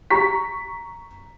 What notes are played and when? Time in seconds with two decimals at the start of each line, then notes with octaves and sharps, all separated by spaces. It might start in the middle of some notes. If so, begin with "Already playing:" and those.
0.10 A#5 C#6 B6